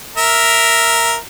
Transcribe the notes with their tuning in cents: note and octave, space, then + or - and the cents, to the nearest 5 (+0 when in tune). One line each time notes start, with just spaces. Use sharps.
A#4 +0 E5 +0